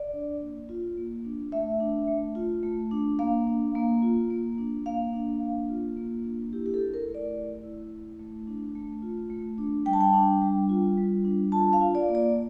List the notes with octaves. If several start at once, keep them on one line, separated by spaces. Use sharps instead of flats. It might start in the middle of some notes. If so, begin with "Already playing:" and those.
Already playing: D5
D4
A#3
F4
A#3
D4
A3 E5
D4
A3
F4
A3
D4
A#3 F5
D4
A#3
F4
A#3
D4
A#3 F5
D4
A#3
F4
A#3
D4
E4 G4
G4
A4
E4
A#4
A3
D5
A3
E4
E4
A3
D4
A3
F4
A3
D4
G3 G5
A5
G5
D4
G3
F4
G3
D4
F4 A5
F5
F4
D5
A#3
D5